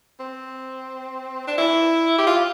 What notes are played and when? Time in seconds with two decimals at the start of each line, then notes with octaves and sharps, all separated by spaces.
0.20 C4
1.47 D4
1.58 E4
2.18 G4
2.27 F4